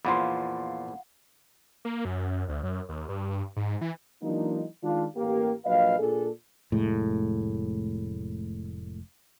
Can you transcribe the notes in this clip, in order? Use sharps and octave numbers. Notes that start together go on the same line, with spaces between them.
E2 A#2 F3 F5 F#5 B5 C6
A#3
F#2
D2
F#2
D#2
G2
G#2
E3
E3 F#3 G#3 A#3 D4 D#4
D#3 G#3 D4 F4
A1 A#3 G4
A#1 F#3 B4 D#5 F5
A#2 A#3 D4 G#4 A4
F1 A2 G#3